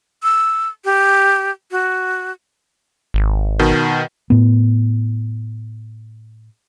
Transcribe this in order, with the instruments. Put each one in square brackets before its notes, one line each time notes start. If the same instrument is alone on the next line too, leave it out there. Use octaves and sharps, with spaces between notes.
[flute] E6
G4
F#4
[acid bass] G#1
[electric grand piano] B2 D#3
[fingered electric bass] A2 B3